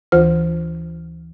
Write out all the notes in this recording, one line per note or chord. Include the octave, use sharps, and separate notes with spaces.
D2 E3 F4 C5 F6